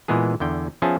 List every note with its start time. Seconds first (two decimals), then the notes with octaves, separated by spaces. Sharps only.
0.08 A#2 E3 G#3 B3 G#4
0.40 E2 D3 G5
0.82 F3 B3 C#4 G#4 E5 A5